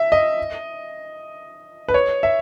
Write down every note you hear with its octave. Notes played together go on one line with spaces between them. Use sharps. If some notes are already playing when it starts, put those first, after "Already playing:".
Already playing: E5
D#5
B4
C#5
E5